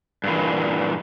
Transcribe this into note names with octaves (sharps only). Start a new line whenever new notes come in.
G2 A#2 E3